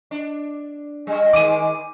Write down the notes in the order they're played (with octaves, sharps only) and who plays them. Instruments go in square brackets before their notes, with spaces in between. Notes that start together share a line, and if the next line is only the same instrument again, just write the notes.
[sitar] D4
G2 G3
[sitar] D#3 G#3 [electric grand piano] D6 D#7